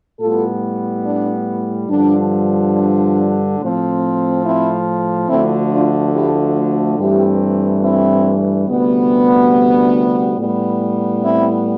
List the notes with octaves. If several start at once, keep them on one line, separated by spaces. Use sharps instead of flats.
A2 G3 B3 F4 A4
D4
G2 D3 F3 D4
D4
A2 F3 C4
C4 E4
D2 D3 F3 A3 C4 E4
D4 F4
E4 G4
G2 E3 A3 C4 E4 G4
C4 E4
D2 C3 G3 B3
D4
A2 G3 B3
C4 E4